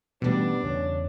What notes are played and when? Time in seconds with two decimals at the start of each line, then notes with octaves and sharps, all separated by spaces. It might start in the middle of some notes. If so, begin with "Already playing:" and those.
0.22 B2 E3 G3 A3 B3 C#4 D4
0.63 E2 C#3 C#5